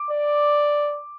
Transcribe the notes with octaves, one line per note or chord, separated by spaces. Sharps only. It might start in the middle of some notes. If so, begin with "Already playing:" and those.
Already playing: D6
D5